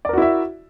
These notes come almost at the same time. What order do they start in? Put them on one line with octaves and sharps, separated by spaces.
D5 A#4 F#4 E4 E5